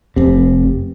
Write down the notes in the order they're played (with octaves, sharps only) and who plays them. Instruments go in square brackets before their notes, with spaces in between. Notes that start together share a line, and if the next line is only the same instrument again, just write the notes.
[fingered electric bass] F1 C3